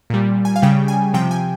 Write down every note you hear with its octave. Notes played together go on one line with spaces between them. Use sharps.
A#2 G3
G#5
F5
C#3 G3 G5
G#5
C3 F3 G5
G#5